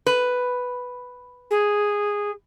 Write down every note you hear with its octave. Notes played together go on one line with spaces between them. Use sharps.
B4
G#4